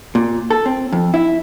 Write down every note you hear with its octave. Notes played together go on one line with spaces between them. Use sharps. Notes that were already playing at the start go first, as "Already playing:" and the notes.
A#2
A4
C4
F2
E4